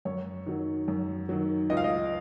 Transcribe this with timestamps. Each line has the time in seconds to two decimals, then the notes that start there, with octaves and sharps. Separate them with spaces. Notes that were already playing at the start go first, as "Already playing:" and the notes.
0.05 F#2 C#5
0.46 D#3 F#3
0.88 F#2
1.29 D#3 F#3
1.70 C#2 D#5
1.77 F5
1.84 D#5